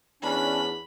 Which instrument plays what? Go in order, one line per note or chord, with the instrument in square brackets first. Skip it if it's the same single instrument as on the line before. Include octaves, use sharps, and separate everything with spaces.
[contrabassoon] E2 [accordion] C#4 D4 [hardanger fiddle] B5